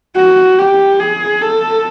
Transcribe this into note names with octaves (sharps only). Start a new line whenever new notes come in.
F#4
G4
G#4
A4